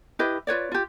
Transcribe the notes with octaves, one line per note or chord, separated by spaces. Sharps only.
E4 G4 B4 D#5
F4 B4 C#5 D5
F4 G4